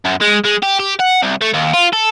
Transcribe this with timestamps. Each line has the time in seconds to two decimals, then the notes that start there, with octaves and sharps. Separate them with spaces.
0.05 F#2
0.22 G#3
0.45 G#3
0.63 G4
0.80 G4
0.99 F#5
1.22 C2
1.41 A3
1.54 D#2
1.73 F4
1.93 A4